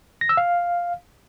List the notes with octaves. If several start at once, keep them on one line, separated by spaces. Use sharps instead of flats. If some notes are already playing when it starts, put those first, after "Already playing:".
A#6
E6
F5